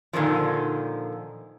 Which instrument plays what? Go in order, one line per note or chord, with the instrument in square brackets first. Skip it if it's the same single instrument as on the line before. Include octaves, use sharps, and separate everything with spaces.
[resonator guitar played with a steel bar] A#2 D3 D#3 F3